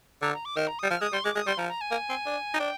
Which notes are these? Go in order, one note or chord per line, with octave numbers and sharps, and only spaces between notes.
D3 A#5
A#5
D6
D#3 F6
A#5
G3 D#6
F3 F6
G#3 D#6
G3 C6
G#3 D6
G#3 D#6
G3 C6
F3 A#5
A#5
G#5
A#3
C4
D4
D#4
D4 G5